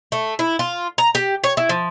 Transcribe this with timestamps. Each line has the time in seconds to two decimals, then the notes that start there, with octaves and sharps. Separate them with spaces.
0.12 A3
0.39 E4
0.59 F4
0.98 A#5
1.15 G4
1.44 C#5
1.57 E4
1.69 F3